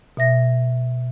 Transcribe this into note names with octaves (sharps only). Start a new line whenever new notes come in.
B2 E5 A#6